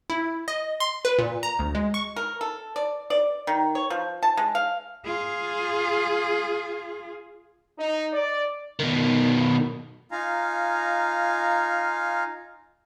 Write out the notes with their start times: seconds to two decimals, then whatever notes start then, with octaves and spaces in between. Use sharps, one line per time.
0.10 E4
0.48 D#5
0.80 C6
1.05 B4
1.19 A#2
1.43 A#5
1.59 D2
1.75 G#3
1.94 C#6
2.16 A#4
2.41 A4
2.76 D5
3.10 D5
3.47 D#3
3.75 C#5
3.90 F3
4.23 A5
4.37 G#3
4.55 F5
5.05 F4 G#4
7.78 D#4
8.13 D5
8.79 B2 D#3
10.12 D#4 F4 F5 G#5 A#5